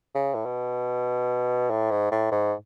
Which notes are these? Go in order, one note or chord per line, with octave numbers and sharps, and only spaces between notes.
C#3
A2
B2
A2
G#2
A2
G#2